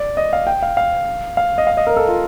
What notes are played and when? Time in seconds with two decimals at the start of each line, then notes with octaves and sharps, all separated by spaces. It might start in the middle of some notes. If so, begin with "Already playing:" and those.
Already playing: D5
0.17 D#5
0.33 F5
0.47 G5
0.62 F5
0.77 F5
1.37 F5
1.58 D#5
1.67 F5
1.77 D#5
1.87 A#4
1.96 A4
2.08 F4